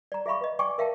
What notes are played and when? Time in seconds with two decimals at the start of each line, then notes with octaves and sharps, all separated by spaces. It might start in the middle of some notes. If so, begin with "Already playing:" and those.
0.12 D5 A#5
0.26 G#4 E5 F5 B5 C#6
0.41 B4 D#5
0.59 D5 G5 G#5 C#6 D6
0.78 A#4 E5 F5 G5 A5